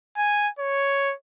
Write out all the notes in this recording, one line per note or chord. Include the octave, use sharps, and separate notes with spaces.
G#5
C#5